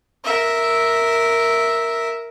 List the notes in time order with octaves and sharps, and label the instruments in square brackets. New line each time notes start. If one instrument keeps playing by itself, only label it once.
[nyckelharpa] A#4 E5